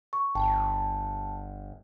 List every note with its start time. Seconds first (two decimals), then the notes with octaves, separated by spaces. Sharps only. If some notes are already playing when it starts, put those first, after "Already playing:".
0.13 C#6
0.35 G1 G5 A5